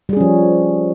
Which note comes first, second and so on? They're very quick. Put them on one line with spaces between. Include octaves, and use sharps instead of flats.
G3 G#4 C#4 F3